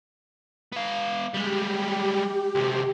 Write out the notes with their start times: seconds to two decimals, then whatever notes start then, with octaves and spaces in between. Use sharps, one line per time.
0.72 B3 F5
1.34 G3 G#3 G4
2.55 D2 C3